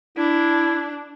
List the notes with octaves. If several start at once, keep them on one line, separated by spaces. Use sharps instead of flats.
D4 E4